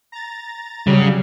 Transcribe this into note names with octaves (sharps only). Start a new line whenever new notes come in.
A#5 A6
C#3 F#3 G3